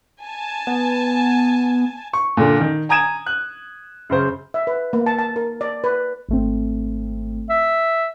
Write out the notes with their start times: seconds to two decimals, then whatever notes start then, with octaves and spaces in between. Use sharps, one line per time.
0.21 G#5 A5
0.67 B3
2.13 C#6
2.37 A#2 D3
2.60 D#3
2.89 G#5 A#5 D#6 G#6 D#7 E7
3.26 F#6
4.09 F#2 C#3 C5
4.54 E5
4.67 B4
4.93 A#3
5.06 A5
5.19 A5
5.36 A#4
5.61 D5
5.84 B4
6.29 G#1 A3 C4
7.50 E5